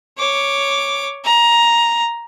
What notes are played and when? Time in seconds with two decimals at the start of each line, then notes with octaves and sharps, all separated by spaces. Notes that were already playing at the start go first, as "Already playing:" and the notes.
0.18 C#5 D6
1.24 A#5